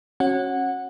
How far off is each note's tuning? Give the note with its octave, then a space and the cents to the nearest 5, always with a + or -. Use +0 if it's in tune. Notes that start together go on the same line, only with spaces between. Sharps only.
C#4 -25 F#4 +0 F#5 -10